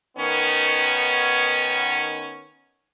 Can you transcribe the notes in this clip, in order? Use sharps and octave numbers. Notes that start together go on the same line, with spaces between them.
D#3 B3 C#4